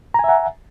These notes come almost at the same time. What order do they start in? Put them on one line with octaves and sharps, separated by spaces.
A#5 G#5 E5 F#5